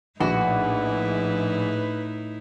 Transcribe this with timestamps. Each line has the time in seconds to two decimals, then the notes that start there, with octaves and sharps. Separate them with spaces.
0.20 A#1 A2 D#4 E4 F#4 B4